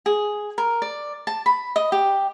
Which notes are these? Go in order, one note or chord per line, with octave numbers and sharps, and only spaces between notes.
G#4
A#4
D5
A5
B5
D#5
G4